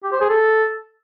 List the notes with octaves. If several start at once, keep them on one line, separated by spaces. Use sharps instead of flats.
G4
C5
G#4
A4